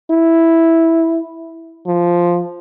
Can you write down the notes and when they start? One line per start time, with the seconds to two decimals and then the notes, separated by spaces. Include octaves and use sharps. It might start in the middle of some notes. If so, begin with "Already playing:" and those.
0.11 E4
1.87 F3